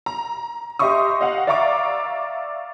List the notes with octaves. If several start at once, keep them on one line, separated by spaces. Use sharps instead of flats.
A#5
G4 D#5 E5 C6 C#6 D#6
D#5 F5 F#5
D5 E5 F5 A#5 C#6 D6